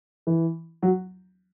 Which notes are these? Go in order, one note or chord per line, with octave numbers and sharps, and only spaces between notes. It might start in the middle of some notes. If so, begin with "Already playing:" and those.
E3
F#3